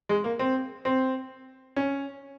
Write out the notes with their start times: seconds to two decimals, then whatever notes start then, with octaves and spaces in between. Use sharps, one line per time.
0.09 G#3
0.24 A#3
0.39 C4
0.85 C4
1.76 C#4